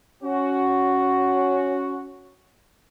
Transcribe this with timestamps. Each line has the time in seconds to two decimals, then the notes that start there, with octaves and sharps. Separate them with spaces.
0.23 C#4 F#4